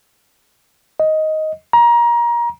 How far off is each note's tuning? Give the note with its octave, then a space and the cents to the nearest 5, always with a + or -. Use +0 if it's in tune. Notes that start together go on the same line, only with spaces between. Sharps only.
D#5 +10
A#5 +25